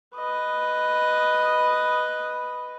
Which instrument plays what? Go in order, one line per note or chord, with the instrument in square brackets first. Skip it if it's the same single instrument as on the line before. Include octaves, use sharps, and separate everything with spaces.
[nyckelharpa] B4 D#5